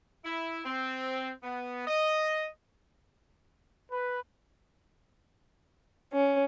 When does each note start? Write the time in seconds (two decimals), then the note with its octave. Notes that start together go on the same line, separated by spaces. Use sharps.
0.25 E4
0.65 C4
1.43 B3
1.87 D#5
3.91 B4
6.13 C#4